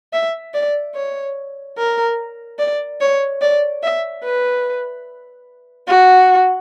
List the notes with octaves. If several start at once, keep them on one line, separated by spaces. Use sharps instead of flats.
E5
D5
C#5
A#4
D5
C#5
D5
E5
B4
F#4